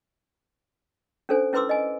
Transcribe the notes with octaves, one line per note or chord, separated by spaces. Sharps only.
C#4 D4 A4 C5 G#5
C#4 E4 B4 C6 D6 E6
D#5 G#5